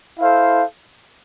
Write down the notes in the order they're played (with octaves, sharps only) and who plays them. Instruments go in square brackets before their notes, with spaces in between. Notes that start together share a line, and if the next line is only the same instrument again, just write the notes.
[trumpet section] E4 A4 C5 F5